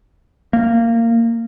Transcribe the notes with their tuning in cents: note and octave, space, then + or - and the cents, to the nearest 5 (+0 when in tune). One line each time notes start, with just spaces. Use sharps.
A#3 -20